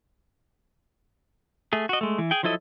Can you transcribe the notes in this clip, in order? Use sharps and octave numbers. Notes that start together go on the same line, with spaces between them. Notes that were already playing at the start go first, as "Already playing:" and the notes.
A3 G#4
F#4 D#5
G#3 A3
E3
G#4 G5
F3 F#3 E4 A4 D#5